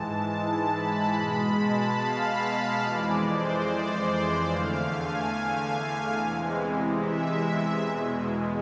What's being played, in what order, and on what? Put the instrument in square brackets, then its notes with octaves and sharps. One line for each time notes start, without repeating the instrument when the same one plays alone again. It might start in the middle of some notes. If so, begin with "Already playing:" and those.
Already playing: [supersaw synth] G#2 E3 G#3 A5
A5
B5
B2 G#3 B5
A5
F5
F2 E3 G#3 D5
C5
D5
E2 D3 A3 F5
G#5
F5
E2 C3 E3 G#3
E5
E2 B2 G#3